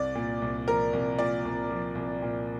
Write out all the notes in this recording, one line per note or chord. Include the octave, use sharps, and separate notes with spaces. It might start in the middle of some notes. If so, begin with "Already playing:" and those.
Already playing: C2 D5
A#2
C2
F3 A#4
C2
A#2 D5
C2
F3
C2
A#2